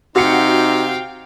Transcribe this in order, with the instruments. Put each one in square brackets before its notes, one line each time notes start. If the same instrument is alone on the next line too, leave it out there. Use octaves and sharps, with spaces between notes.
[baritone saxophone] C3 [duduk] D#4 [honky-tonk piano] F#4 C#7 [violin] F5 G5